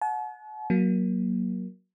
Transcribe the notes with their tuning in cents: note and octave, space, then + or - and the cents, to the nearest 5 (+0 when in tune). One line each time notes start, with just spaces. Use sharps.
F#5 -20 A5 -45
F#3 +0 A#3 +15